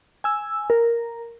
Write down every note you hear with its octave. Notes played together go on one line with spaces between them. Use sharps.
G#5 E6
A#4